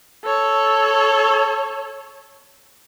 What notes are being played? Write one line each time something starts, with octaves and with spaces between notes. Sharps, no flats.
A4 C#5